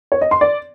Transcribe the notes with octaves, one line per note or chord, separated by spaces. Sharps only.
C#5
D#5
C6
D5